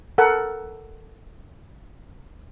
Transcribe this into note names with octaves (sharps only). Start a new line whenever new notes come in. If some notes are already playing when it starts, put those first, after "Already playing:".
A4 A#4 F#5